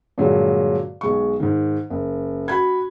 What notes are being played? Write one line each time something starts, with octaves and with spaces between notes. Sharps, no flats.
G2 A#2 D3 F#3 G#3
B1 G#3 C#6
G#2 D#3
F#1
F#4 B5 G#6